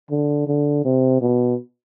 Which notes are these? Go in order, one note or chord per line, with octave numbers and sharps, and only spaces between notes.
D3
D3
C3
B2